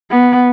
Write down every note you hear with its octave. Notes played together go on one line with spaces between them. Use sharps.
B3